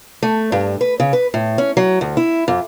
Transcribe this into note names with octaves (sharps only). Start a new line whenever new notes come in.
A3
G2
B4
C#3
B4
A2
C#4
F#3
D2
E4
F2